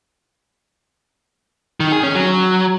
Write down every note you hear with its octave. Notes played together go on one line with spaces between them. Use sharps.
D#3
G#4
C#4
F#3